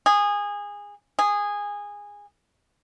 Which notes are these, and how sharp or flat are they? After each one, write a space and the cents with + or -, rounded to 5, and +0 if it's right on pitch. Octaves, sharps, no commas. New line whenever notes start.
G#4 -20
G#4 -15